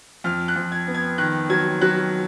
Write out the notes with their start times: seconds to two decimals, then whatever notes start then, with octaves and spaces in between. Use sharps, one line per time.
0.24 F2 F6
0.48 F#6
0.56 F2
0.72 G#6
0.87 B3
0.94 G#6
1.18 D#3 F#6
1.49 F#3 G#6
1.81 F#3 F#6